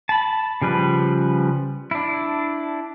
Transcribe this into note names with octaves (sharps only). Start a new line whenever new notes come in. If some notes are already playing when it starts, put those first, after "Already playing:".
A5 B5
C#3 F3 G3 B4
D4 E4